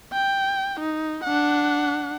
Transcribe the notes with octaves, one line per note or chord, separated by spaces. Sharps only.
G5
D#4
D4 F#5